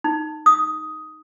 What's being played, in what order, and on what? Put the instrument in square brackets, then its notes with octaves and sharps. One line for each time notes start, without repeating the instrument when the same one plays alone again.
[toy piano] D#4
D#6